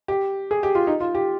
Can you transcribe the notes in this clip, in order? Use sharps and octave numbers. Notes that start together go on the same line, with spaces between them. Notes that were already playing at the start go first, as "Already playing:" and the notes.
G4
G#4
G4
F4
D#4
F4
G4